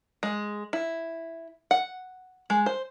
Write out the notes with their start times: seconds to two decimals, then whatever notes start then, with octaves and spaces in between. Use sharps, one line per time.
0.23 G#3
0.73 E4
1.71 F#5
2.50 G#3
2.66 C5